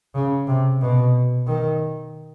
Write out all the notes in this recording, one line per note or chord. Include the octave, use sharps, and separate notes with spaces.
C#3
C3
B2
D#3